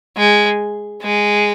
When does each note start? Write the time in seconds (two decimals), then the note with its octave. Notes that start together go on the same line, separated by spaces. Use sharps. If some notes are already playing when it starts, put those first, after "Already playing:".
0.17 G#3
1.03 G#3